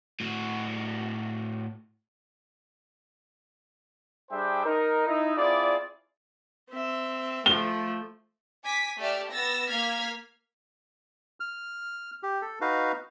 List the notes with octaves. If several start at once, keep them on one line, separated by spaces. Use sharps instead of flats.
A2 F#4
G3 D4 G#4 C5 E5 G5
D#4 A#4
D#4 E4
C4 E4 F4 G#4 D5
C4 E5
F3 A3 G7
G#5 D6 B6
A3 G4 D5 E5 F6
B3 E6 A6 A#6
A#3 F5 F6 G#6 B6
F6
G4
A4
D#4 F#4 B4 F5